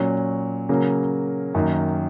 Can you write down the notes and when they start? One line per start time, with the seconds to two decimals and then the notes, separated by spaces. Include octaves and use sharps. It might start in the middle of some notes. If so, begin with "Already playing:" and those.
Already playing: A#2 F#3 C#4
0.69 C#3 F#3 A#3
1.54 F#2 D#3 A#3